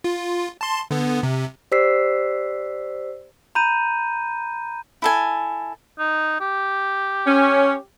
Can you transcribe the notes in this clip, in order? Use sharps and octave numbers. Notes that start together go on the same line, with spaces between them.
F4
A5 C6
D3 B3
C3
G4 C5 D5 E6 B6 C7
A#5 B5 G6 D#7
E4 A4 G#5
D#4
G4
C#4